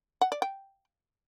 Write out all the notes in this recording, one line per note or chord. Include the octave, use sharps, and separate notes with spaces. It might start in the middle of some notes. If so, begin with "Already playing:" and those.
F#5
D5
G5